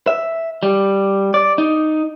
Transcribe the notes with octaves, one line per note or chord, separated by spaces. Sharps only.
E5
G3
D5
D#4